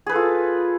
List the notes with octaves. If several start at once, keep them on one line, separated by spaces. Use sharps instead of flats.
F4 G#4 A4 B4